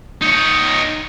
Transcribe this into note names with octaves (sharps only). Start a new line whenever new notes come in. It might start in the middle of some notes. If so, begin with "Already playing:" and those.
D#4 C#5